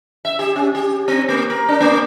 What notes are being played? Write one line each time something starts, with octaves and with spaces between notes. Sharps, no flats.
E5
G4
C#4
G4
C4
A#3
A#4
D4
A#3